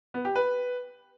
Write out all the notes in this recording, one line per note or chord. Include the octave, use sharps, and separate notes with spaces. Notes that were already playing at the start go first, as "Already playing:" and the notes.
B3
G4
B4